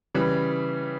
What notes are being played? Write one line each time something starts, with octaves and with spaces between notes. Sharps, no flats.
C#3 E3 G3